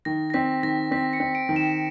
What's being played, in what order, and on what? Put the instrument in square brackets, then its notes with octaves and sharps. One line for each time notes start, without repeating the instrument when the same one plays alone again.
[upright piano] D#3 [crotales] A#6
[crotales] A#6
[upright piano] C4 [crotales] B6
[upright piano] D#3 [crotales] A#6
[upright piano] C4 [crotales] B6
[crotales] C#7
[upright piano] C4
[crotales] D7
[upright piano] D#3
[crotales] E7